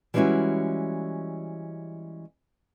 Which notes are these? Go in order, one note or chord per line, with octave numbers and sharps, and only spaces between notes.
E3 G3 G#3 C#4 E4 F#4